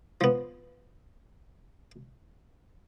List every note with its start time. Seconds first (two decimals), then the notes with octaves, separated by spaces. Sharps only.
0.21 F3 B3